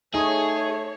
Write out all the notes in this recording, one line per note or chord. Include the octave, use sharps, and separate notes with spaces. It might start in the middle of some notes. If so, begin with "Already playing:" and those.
A3 D#4 G#4 C#5